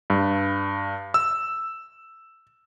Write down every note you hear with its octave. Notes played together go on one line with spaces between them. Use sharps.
G2
E6